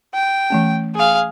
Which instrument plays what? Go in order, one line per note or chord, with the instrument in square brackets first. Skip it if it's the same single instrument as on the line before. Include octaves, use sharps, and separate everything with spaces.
[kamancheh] G5
[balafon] E3 A3 C#4
[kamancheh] G#4 F5